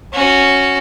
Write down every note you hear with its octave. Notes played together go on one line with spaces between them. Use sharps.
C#4 F#4